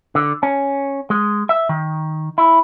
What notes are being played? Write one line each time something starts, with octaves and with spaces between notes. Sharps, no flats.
D3
C#4
G#3
E5
D#3
E4